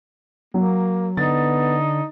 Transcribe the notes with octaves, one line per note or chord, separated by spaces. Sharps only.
F#3 A#3
D3 B3 D#4 A6